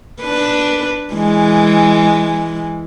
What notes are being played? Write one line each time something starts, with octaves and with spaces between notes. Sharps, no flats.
D4 B4
E3 G#3